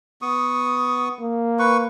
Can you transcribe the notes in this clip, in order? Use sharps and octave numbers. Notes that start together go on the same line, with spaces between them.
B3 C#6 D#6
A#3
B4 C#6